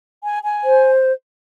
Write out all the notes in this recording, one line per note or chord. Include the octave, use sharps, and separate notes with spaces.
G#5
G#5
C5